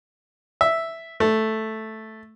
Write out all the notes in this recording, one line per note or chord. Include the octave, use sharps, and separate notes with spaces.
E5
A3